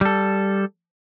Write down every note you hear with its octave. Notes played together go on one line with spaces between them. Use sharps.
G3 A4